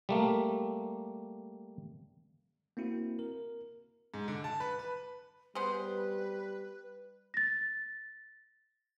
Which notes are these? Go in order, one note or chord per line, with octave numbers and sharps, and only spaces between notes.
G3 A3 A#3
A#3 C4 E4 F#4
A#4
G#2
D3
A5
B4
B4
G3 B3 G#4 B4 C5
A6 A#6